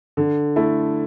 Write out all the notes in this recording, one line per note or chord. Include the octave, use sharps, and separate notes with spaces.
D3
A3 E4